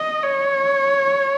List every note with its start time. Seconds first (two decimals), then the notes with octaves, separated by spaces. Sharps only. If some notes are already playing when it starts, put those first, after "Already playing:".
Already playing: D#5
0.23 C#5